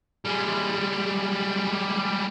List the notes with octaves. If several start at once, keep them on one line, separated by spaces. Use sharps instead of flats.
G3 G#3